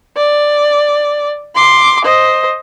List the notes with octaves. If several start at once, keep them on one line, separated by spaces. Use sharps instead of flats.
D5
C6 D6
C5 D#5